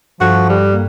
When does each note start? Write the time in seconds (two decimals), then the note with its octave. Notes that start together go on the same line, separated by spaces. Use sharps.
0.21 G2 F3 F#4 A4 F#6
0.49 G3
0.73 A#3